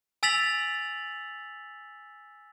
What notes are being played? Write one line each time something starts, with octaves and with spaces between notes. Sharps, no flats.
G#5 E6 A6 B6 F7 F#7